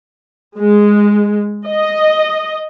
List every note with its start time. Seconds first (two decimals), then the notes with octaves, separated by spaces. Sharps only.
0.58 G#3
1.68 D#5